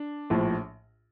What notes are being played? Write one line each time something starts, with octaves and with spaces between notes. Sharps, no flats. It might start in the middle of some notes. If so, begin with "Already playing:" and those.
Already playing: D4
A#1 A2 F3